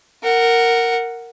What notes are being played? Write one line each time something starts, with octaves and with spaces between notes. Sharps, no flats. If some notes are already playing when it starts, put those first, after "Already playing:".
A#4 F#5